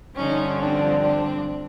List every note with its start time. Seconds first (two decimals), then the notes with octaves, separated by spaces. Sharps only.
0.16 G2 D3 F3 C#4 D#4
0.58 C4 D4
1.00 C4 D4